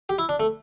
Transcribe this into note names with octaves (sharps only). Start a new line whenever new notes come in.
G4
E4
D4
A3